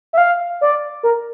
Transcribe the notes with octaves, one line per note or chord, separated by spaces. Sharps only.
E5
F5
D5
A#4